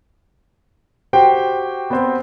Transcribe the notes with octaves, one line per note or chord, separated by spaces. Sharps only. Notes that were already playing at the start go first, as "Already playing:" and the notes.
F#4 G4 C5 G5
B3 C4